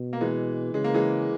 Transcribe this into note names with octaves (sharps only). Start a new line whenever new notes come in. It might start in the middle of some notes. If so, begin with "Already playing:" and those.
Already playing: B2
A#3
E3 G#3
C#3 G#3
A#3
E3 G#3